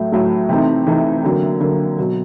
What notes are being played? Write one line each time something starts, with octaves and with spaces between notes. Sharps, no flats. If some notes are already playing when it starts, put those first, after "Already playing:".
Already playing: A2 F#3 A3
A2 F#3 A3
C3 E3 A3 C4 D#4
C3 E3 A3 C4 D#4
D3 F#3 A#3
D3 F#3 A#3
B2 F#3